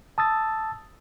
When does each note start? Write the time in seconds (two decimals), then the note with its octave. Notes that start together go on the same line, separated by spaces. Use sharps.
0.18 A5 D#6 E6 A6